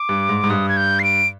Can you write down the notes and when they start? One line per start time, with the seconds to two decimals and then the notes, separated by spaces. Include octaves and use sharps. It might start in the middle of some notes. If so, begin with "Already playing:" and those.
Already playing: D6
0.09 G2
0.29 G#2
0.44 G#2
0.50 G2 D#6
0.69 G#6
0.77 G6
0.99 C7
1.04 D7